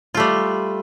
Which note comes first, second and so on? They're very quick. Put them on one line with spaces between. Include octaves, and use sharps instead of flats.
F4 A3 G3